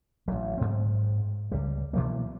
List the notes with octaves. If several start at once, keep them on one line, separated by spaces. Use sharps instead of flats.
A1 F#3
G#2 C4
C#2 G3
B2 E3 F#3 A#3